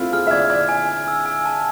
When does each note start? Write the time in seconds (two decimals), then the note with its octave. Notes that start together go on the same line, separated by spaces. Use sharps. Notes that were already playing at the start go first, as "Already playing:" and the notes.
Already playing: A3 C4 E4 F4
0.13 G#4 F6
0.27 E5
0.31 D5 G#6
0.50 D5 G#6
0.69 G#5
0.89 G#5
1.08 E6
1.26 G#5
1.46 A5